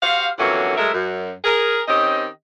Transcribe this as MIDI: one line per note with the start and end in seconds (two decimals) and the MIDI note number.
0.03 0.28 66
0.03 0.28 67
0.03 0.28 72
0.03 0.28 77
0.39 0.77 41
0.39 0.77 50
0.39 0.77 52
0.39 0.77 54
0.39 0.77 58
0.39 0.77 61
0.78 0.93 54
0.78 0.93 56
0.78 0.93 57
0.78 0.93 70
0.78 0.93 76
0.94 1.31 42
1.44 1.82 68
1.44 1.82 70
1.88 2.26 51
1.88 2.26 60
1.88 2.26 61
1.88 2.26 67
1.88 2.26 75